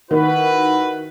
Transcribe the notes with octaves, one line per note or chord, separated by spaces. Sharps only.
D#3 E4 F#4 B4